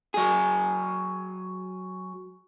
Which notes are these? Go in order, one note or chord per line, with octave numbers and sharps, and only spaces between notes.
F#3 G#4